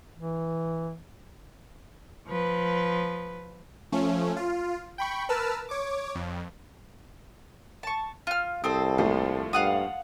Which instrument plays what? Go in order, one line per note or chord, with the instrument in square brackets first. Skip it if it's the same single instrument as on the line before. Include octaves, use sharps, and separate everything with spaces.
[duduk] E3
[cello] F3 B4
[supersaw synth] F3 A3 C#4
F4
G5 B5 C#6
A#4 B4 A5 E6 F6
C#5 D6
F2
[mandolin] A5 C#6
F4 F6
[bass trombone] C2 [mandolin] C4 A4 C5 [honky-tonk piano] D#6
[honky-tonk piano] D#2 F3 A3 [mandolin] C5
[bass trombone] G2 [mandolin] F5 F#5 D#6